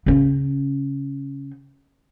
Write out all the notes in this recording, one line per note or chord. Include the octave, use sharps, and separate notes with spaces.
C#3 C#4